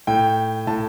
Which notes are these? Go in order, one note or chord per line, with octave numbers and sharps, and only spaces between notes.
A2 G5
A2 A5